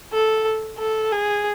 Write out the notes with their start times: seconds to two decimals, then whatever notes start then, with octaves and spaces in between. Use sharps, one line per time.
0.13 A4
0.78 A4
1.12 G#4